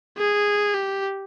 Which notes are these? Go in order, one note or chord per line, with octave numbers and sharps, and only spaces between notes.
G#4
G4